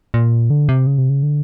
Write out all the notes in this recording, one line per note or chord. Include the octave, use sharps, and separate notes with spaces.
A#2
D3
C3
C#3
C3
C#3
D3